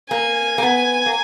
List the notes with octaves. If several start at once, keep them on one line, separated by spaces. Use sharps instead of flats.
A#3 G#5
A#3
B3
A#3